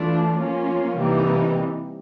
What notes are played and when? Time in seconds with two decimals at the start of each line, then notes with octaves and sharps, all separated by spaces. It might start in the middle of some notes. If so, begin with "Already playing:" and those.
Already playing: E3 A3 D4 F4
0.37 F3 A#3 C#4 F4
0.97 C3 E3 G3 A#3 D#4